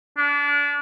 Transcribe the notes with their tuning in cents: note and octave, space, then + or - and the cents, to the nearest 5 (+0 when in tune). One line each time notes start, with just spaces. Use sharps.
D4 -30